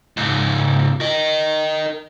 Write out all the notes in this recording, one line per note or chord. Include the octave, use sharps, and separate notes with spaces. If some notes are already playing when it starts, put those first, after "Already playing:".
C#2 G#2
A#4 D#5